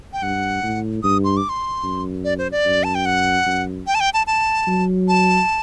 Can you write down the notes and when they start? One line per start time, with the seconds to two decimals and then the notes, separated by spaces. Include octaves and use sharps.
0.13 G5
0.22 G2 F#5
0.63 A2
1.03 G2 D#6
1.24 C6
1.37 D6
1.49 C6
1.84 F#2
2.24 D5
2.38 C5
2.52 D5
2.66 F#2
2.84 A5
2.95 G5
3.06 F#5
3.46 F#2
3.87 G5
3.95 A5
4.00 G5
4.14 A5
4.27 A5
4.67 F#3
5.08 A5